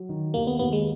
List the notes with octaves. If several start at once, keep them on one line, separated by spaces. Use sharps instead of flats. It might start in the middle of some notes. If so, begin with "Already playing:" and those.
Already playing: F#3
D#3
D#2 A#3
B3
D#2 B3
G#3